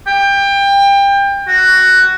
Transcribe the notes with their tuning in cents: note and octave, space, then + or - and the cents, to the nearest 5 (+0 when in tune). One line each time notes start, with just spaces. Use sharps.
G5 +25
F#4 +10